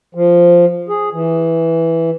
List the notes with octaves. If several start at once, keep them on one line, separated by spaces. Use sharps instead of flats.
F3
G#4
E3